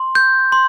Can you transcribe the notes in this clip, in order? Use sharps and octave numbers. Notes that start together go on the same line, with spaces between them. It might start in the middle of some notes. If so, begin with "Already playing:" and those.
Already playing: C6
G6
C6